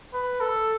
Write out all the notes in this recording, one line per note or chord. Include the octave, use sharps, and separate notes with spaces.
B4
A4